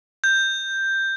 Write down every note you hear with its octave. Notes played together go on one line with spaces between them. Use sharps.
G6